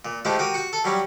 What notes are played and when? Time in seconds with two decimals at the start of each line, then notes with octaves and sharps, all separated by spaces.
0.05 A#2
0.25 F3 G#3 A3 E4 F4 G4
0.39 F#4 G4 A#4 D#6
0.54 F#4 C#6
0.73 A4
0.84 F#3 G3 C#4 G4